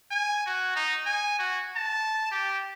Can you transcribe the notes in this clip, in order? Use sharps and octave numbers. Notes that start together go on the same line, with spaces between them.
G#5
F#4
D#4
G#5
F#4
A5
G4